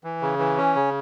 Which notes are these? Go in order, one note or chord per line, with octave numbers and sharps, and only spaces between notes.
E3
C#3
E3
C#4
C#3